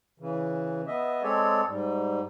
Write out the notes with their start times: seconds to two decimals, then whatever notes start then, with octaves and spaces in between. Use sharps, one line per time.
0.20 C#3 E3
0.88 B3 D#5 E5
1.23 G#3 C4 G#4 A4 C#5 D5
1.67 G#2 G3